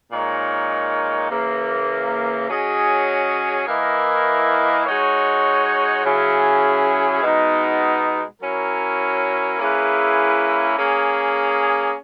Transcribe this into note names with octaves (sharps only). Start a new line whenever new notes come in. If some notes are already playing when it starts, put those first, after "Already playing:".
A#2 G#3 D#4 A#4 C#5
C#3 E3 A#3
F#3 C#4 G#4 D#5
E3 A#3 E4 A#4 D#5
G#3 D#4 F#4 C#5
C#3 F#3 C#4 E4 G#4
B2 G#3 B3 D#4
F#3 C#4 E4 A#4
A#3 C#4 E4 G#4 B4
A#3 C#4 G#4